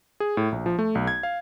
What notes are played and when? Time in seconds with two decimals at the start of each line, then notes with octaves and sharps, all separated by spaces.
0.20 G#4
0.37 A2
0.52 A#1
0.66 F3
0.79 A3
0.95 B1
1.07 G#6
1.23 F5